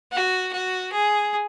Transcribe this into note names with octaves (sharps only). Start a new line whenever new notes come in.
F#4
F#4
G#4